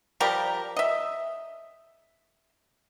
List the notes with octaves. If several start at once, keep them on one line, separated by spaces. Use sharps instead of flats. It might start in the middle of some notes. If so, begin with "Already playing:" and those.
F3 G3 G4 A#4
D#5 E5